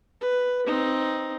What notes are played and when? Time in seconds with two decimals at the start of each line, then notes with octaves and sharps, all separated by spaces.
0.21 B4
0.66 C4 D#4